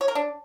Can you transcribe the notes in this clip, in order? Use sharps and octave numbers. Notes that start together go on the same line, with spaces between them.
C#5
A#4
D4